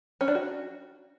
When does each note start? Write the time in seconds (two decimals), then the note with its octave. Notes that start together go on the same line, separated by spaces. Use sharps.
0.21 C#4
0.28 D4
0.35 F#4